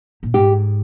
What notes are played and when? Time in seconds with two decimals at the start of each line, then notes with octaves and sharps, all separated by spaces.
0.23 A#2
0.34 G#2 G4